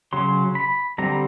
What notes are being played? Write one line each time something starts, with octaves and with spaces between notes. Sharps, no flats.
C#3 F#3 C6
B5
D3 G3 C4 A#5